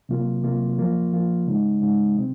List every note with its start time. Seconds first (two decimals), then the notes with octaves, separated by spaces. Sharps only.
0.09 C3 F#3 A#3 F4
0.43 C3 F#3 A#3 F4
0.78 F3 A#3 F4
1.13 F3 A#3 F4
1.47 C#3 G#3 D#4
1.81 C#3 G#3 D#4
2.15 C3 F#3 C4